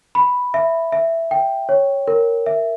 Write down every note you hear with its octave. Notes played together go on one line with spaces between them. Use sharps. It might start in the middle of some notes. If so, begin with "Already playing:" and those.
B5
E5
E5
G5
C#5
A#4
E5